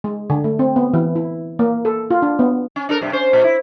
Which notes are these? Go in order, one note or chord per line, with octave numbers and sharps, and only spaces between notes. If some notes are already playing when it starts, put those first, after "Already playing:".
G#3
D3
A3
C4
B3
E3
E4
A#3
A4
F4
D4
B3
C#4
D4 A4 A#4
G2 C3
C#4 C5
A#2
E4